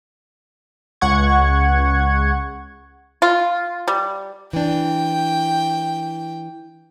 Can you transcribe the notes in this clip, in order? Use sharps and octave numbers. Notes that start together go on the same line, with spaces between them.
C#2 F#5 C#6 G#6
F4
G3
E3 D4 G5